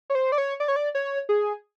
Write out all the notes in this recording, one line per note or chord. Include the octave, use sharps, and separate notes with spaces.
C#5
C5
D5
C#5
D5
C#5
D5
C#5
G#4